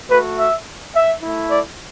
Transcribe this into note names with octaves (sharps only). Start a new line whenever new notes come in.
A3 F#4 B4
E5
E5
A3 E4
D5